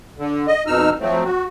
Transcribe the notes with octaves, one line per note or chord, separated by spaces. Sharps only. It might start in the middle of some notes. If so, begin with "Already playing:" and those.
D3
D#5
F2 B2 D#4 E6 F6
F3 F#3 A3 C4
F#4